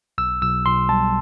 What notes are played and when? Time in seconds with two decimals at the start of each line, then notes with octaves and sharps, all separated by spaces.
0.18 B1 E6
0.42 B1 E6
0.66 B1 C6
0.89 G3 A5